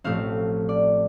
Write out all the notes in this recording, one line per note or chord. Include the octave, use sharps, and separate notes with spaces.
A1 A2 F3 A3 C4 F5
D5